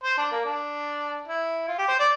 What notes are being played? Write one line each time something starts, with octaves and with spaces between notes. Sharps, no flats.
C5
D4
A#3
D4
E4
F4
G4
C5
D5